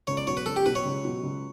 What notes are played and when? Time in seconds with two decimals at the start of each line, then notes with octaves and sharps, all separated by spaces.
0.07 C#2 C#5
0.17 D5
0.27 B2 F#3 C#5
0.37 B4
0.46 C#2 A4
0.56 G4
0.66 B2 F#3 B4
0.75 C#5
0.85 C#2
1.05 B2 F#3
1.23 C#2